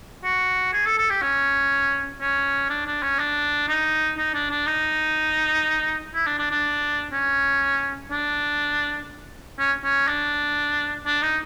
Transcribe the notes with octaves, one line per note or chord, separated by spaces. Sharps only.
F#4
G#4
A4
A4
G4
C#4
C#4
D4
D4
C#4
D4
D#4
D#4
D4
D4
D#4
E4
D4
D4
D4
C#4
D4
C#4
C#4
D4
D4
D#4